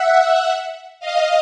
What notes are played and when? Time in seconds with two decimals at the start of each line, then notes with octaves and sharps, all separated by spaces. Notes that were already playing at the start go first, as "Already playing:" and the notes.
Already playing: E5 F#5
0.99 D#5 F5